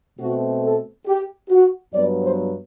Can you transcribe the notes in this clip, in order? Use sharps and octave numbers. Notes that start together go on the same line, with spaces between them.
B2 A3 C4 F#4
A4
G4
F#4
G2 F#3 B3 D5
C5